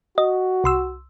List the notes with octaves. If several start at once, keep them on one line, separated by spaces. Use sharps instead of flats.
F#4 D#5
C2 C6 E6